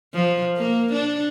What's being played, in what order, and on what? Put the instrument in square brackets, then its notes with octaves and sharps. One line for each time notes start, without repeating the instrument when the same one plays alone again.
[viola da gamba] F3
A#3
D4